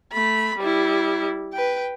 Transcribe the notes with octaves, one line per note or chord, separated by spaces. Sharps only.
A3 B5
G3 E4
B4 G5